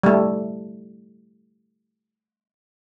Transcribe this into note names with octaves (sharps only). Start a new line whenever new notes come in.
G3 A3